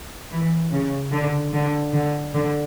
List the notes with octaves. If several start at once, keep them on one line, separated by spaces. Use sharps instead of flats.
E3
C#3
D3
D3
D3
D3